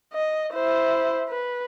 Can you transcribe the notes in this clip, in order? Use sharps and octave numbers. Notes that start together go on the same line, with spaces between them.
D#5
E4 C5
B4